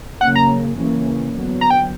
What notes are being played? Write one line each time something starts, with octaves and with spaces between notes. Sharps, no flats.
C#3 F#3 A#3 C#4 F#5
A#5
C#3 E3 A#3 C#4
D3 F#3 B3
A#5
G5